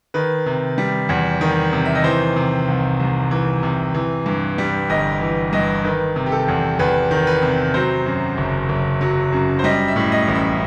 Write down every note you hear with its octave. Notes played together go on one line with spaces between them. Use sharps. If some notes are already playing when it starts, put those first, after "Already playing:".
D#3 B4
C3
G3
E2
D#3
C3
E5
D#5
E3 C5
C3
C2
C2
E3
C3
E3
G2
G3
G1 D#5
E3
G2 D#5
D#3 B4
C3
G4
A4
E2
E2 B4
D#3
B4
C3
F#3 C5
F#2
F#1
F#1
F#3
F#2
C5
G3 D#5
E5
A2
D#5
A1
E5